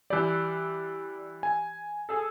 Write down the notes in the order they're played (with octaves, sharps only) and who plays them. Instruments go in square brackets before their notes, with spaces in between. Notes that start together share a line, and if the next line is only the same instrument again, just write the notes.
[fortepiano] E3 G3 [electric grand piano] D5
[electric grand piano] G#5
[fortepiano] G#4 A4